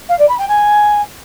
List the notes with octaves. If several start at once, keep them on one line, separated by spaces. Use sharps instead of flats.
F5
D5
B5
G5
G#5